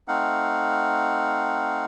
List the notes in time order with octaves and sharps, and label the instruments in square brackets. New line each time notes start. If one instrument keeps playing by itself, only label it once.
[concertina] A3 C4 D#4 F5 F#5